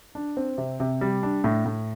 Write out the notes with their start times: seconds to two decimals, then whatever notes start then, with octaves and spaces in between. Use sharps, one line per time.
0.15 D4
0.37 C4
0.58 C3
0.80 C3
1.01 G3
1.23 D4
1.44 A2
1.66 A2